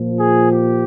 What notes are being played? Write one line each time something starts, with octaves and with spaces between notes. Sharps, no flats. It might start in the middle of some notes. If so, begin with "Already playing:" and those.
Already playing: A#2 F3
G#4
G4